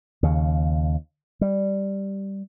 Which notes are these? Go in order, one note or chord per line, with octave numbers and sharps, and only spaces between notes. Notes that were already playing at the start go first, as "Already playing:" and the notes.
D#2 C#3
G3